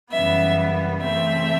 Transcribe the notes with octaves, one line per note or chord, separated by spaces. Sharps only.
F#2 C#3 E3 G3 B3 E5
C#3 E3 A3 C4 E5